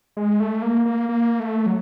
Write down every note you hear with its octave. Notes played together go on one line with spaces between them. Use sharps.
G#3
A3
A#3
A#3
A#3
A3
F#3